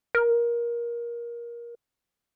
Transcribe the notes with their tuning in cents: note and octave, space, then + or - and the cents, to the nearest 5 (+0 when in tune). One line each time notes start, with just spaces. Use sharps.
A#4 +20